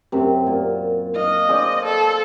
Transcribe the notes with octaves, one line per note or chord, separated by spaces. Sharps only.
F#2 C3
A#2
D#5 F5
G#4 C5 D5
A4